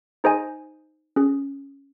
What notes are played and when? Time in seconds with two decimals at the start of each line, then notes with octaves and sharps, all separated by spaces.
0.24 D#4 G#4 C5 D#5 G#5
1.16 C#4 G#4